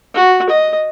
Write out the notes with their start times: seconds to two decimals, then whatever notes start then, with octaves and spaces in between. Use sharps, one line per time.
0.14 F#4
0.49 D#5